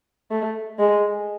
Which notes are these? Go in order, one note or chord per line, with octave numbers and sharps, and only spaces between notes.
A3
G#3